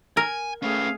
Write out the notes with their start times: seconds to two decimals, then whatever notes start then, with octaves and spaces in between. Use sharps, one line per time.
0.17 A#4 G#5
0.62 A3 C#4 G#4 B4 F5